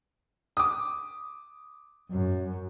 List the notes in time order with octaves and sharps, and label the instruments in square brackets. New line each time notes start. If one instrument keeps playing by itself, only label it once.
[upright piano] D6 D#6
[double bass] F#2